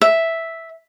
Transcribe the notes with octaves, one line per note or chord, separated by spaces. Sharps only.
E5